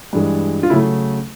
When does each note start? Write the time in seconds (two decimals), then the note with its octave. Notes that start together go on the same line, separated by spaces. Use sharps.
0.13 G2 E3 G#3
0.63 F4
0.70 C#3 F#3 A3 E4